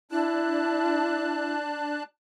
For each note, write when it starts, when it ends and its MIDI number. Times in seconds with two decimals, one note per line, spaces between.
0.11 2.03 62
0.11 1.55 64
0.11 2.03 81
0.11 2.03 90